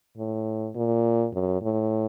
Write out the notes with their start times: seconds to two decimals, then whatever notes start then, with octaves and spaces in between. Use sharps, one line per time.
0.18 A2
0.75 A#2
1.33 F#2
1.61 A2